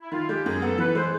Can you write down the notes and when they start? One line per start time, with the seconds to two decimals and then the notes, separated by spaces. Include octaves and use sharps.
0.01 E4
0.12 D#3 F4
0.28 G#3 G4
0.45 F#2 G#4
0.62 B3 A4
0.78 E3 B4
0.95 G#3 C5